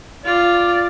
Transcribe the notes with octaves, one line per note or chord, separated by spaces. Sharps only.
F4 D5